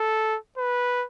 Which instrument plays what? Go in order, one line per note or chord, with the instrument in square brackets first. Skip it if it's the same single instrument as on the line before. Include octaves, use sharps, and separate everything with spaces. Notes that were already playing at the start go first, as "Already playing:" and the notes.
Already playing: [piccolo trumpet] A4
B4